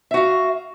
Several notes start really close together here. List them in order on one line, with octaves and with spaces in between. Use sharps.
E5 F#4 F5